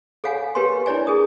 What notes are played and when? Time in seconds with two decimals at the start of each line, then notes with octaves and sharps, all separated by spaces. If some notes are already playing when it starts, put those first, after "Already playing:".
0.24 A4 C#5 F5 F#5 G#5
0.55 G4 A#4 B4 C#5 G#5 C6
0.86 D4 E4 C#5 D5 G#5
1.07 G#4 A#4 D#6